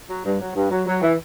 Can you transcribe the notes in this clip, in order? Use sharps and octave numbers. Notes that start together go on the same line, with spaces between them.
F#3
G2
F#3
G2
F#3
F#3
E3